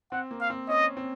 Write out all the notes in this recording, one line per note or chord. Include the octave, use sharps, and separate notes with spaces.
C4 F#5
A#3
F5
C4
C#4 D#5
C4